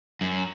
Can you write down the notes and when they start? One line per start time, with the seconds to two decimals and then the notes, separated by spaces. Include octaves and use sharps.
0.21 F#2